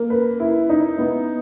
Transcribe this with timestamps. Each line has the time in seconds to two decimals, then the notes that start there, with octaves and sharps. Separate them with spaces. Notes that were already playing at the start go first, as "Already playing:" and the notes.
Already playing: A#3
0.10 B4
0.40 E4
0.69 D#4
0.98 B3